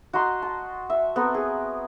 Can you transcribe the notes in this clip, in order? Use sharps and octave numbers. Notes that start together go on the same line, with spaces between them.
F#4 D#5 A#5 C6
A5
E5
B3 C4 A4 A#4
G#4